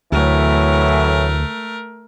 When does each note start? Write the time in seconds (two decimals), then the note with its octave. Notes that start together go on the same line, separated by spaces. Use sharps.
0.12 D2 A2 E3 F#3 A3 A#4